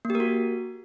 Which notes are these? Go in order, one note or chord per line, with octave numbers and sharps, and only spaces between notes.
A#3
G4
A#4
F#4